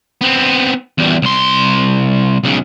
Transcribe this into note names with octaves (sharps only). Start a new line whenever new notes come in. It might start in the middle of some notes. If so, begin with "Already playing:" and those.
B3 C4
E2 G3
C2 C6
B1 C#3